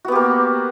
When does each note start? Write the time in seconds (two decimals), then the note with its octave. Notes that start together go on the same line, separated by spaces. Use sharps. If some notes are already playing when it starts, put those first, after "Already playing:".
0.05 F#4
0.08 B3
0.12 G4
0.16 A#3